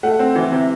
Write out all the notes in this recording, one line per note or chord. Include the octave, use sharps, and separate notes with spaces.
A3 F#5
C4
E3
C3